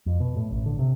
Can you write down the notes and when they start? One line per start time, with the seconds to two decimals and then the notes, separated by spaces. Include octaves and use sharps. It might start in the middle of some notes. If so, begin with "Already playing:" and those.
0.06 F2
0.20 B2
0.36 A2
0.51 A1
0.66 D3
0.79 C3